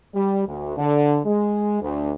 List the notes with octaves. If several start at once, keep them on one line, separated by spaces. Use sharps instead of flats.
G3
D2
D3
G#3
D2